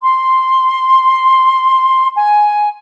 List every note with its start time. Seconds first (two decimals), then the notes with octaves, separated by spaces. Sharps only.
0.02 C6
2.16 G#5